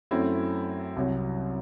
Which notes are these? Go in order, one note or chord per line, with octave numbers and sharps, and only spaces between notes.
F#2 F#3 A3 C4 E4
C2 C3 F#3